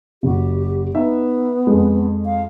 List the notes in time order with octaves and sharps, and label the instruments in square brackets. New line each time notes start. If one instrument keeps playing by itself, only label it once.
[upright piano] F#1 F#4 [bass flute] G4
[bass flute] B3 [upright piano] D#4 E5
[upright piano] F2 G#3
[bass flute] F5